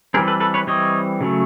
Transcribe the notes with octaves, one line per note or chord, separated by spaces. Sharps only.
E3 G3 C4 G#4 A#4
A4 B4
A4 B4
B4 C#5
E3 G3 C4 C#5 D#5
C#3 F#3 A3